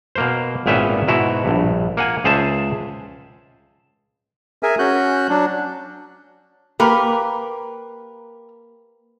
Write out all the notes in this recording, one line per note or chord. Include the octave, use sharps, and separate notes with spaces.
B2 A#3 C5
G#1 A#2 B3 C#4 E5 G5
G#2 B2 E4 F#4
A#1 G2
A#3 F#5 G#5
C#2 G#4 C5 E5 A5
G#4 A#4 E5 G#5
C#4 F#4 F#6 G6
F#3 D4
A#3 G4 A#4 B4